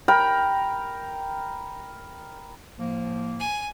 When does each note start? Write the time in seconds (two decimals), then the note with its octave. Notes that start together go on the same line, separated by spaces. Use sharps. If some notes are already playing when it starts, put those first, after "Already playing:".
0.08 A#4 G5 B5
2.79 A2 F3 A#3
3.39 G#5